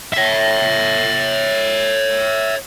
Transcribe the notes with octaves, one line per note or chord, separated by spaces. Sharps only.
C#5 E5